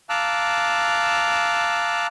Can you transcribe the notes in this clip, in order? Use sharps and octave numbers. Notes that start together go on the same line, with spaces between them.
F5 A5 A#5 D6 E6 F#6